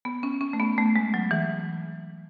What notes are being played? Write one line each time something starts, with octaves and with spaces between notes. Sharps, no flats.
B3
C#4
C#4
A3
B3
A3
G#3
F#3
E3